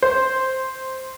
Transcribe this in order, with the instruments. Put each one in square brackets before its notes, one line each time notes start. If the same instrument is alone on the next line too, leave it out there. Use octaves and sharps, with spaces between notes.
[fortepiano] C5